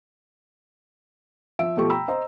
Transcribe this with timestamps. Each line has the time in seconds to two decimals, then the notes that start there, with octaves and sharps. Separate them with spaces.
1.59 F3 E5 D7
1.77 B2 F3 A3 G4 C#6
1.90 G5 A#5 B5 E6
2.08 C5 D#5 A#5